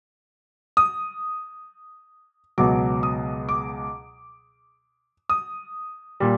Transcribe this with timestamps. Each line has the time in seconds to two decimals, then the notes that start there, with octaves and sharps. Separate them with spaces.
0.77 D#6
2.58 C#2 B2 F#3 D6
3.03 D#6
3.49 D6
5.29 D#6
6.20 A#2 G3